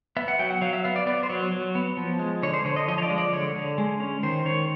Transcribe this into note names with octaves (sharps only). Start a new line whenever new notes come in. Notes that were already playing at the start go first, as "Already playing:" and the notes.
B3 E5
F#5
F#3 G5
F#5
F#3 F5
E5
B3 F5
D5
B3 D5
C5
F#3 C#5
F#3
B3
F3
G#3
D3 C#5
C5
D3 C#5
D#5
F3 D#5
C#5
D5
G#3
D5
D3 C#5
D3
G#3
C#4
D#3 C5
D#3 C#5